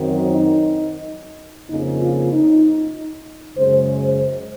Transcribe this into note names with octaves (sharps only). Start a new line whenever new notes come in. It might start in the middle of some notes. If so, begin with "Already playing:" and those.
Already playing: F#2 D#3 F#3 C4
D#4
F2 C#3 F3 A#3 D#4
F4
D#4
F#2 C#3 G#3 C5
C5